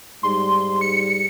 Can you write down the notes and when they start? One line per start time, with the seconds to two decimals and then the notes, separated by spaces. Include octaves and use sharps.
0.23 G#2 G3 C6
0.81 C#7